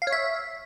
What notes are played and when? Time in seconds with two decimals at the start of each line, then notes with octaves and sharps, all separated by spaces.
0.02 F5
0.07 C#5
0.12 E5